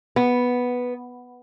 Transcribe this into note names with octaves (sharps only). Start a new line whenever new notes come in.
B3